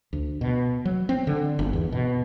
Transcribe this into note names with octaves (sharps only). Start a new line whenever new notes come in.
D2
B2
F#3
C4
D3
G1
E2
B2